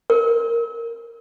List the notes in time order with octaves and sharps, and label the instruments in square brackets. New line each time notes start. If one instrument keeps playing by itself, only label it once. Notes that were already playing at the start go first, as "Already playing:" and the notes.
[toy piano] A#4